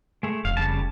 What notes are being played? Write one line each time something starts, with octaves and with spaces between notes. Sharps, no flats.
G#3 A3
F1 F5
C#3 G3 A5